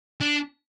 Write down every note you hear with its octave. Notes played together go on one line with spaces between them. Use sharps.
D4